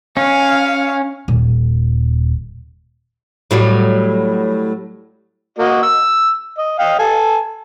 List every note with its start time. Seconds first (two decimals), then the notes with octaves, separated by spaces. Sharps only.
0.17 C#4 F5
1.28 D#1
3.51 A2 F#3 G3
5.59 A#3 F#4 D#5
5.83 E6
6.58 D#5
6.79 D#5 F5 G5
6.99 A4 G#5 A5